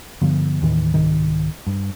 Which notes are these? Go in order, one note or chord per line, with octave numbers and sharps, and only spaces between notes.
G2 D3 F3 B3
D#2 A2 D#3 E3
C2 G#2 D#3
G2